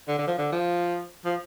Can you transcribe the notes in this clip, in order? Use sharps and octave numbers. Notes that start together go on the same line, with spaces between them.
D3
D3
F3
D3
F3
F3